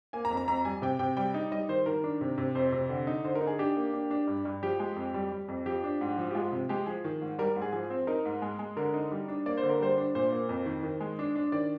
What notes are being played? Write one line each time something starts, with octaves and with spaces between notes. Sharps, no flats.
A#3 G#5
A#5
F2
A#5
F2 A#5
G3 G#5
C3 G5
C3 G5
G3 G5
D#4
G3 D#5
D#3 C5
D#3 A#4
D4
C3
C3
F2 C5
C3
D3
D#4
D3 C5
A#4
D#4
G#4
D4 G4
A#3
D4
D4
G2
G2
F3 G4
G#3
F2
G3
G3
F2
F3 G4
D4
G#2
F3
G4
G#3 F4
C3
G#3 G4
F3 G#4
D#3
G#2
G3 A#4
G#2
G#4
F3 G#4
C4
D#4 A#4
G#2
G#3
G#3
D3 A#4
D#4
G3
D4
A#3 D5
C5
D3
A#4
G3 C5
D4
A#2 C5
A#3
F2
D#3
D#3
G#3
D4
D4
D#3 D5